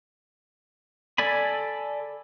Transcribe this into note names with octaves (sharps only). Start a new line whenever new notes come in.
A4 D5 G#5 B5